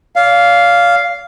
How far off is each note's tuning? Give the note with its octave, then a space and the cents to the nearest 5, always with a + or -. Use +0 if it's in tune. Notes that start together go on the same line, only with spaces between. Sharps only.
D5 -40 F5 +0